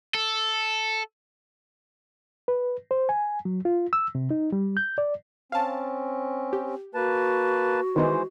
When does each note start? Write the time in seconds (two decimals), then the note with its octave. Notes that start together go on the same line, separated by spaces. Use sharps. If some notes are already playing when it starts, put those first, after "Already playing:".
0.14 A4
2.48 B4
2.91 C5
3.09 G#5
3.45 F#3
3.65 F4
3.93 E6
4.15 C3
4.31 D#4
4.52 G3
4.77 G6
4.98 D5
5.52 C4 C#4 F5 A5
6.53 G4
6.95 A#3 F#4 B4 A5
7.96 D#3 E3 G#3 B3 D#4 C5